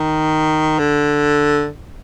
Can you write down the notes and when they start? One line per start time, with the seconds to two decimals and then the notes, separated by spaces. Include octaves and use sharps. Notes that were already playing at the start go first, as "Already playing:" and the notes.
Already playing: D#3
0.79 D3